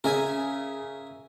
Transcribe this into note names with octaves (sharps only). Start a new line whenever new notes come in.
C#3 A#4 E5 G#5